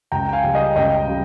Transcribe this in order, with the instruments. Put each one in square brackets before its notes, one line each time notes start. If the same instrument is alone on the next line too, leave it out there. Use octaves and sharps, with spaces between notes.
[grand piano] C#2 G5 A#5
G5
F5 G#5
C#3 G3
D#5 G5
C#2 D#5 G5
C#3 G3